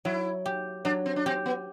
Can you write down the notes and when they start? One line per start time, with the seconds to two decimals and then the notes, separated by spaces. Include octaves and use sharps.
0.05 F#3 E4
0.46 G4
0.85 F#3 D4
1.06 C4
1.16 D4
1.26 C4 G4
1.46 B3